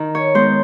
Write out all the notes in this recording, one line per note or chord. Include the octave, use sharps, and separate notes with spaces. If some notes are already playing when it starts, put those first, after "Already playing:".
Already playing: D#3
C#5
G#3 B3 D#4 C5